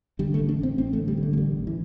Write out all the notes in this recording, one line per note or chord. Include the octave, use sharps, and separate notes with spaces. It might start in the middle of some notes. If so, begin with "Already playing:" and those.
D3 G3
A3
A1
D4
A1 C4
A1 C4
A3
D3
G3
D3
A3
A3
A1 G3
A1
E3